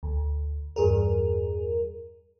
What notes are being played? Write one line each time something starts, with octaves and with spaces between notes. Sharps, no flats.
D2
E2 G2 G#4 A#4